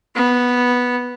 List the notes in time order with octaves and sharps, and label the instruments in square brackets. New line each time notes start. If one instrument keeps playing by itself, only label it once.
[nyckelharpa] B3